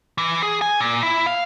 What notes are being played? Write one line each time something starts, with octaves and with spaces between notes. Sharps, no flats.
E3
G#4
G#5
A#2
E4
F5